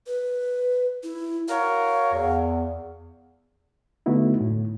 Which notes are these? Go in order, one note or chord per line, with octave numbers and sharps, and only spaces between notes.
B4
E4
F#4 A#4 C#5 F5
E2
D3 A3 B3 D#4 E4 F#4
A2